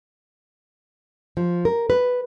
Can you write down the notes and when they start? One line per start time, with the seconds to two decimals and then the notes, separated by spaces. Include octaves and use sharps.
1.37 F3
1.65 A#4
1.90 B4